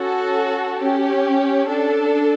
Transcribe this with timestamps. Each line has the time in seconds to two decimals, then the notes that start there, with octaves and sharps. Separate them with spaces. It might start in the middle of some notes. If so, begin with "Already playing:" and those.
Already playing: C#4 F#4 A4
0.79 C#4 G4
1.69 D4 A4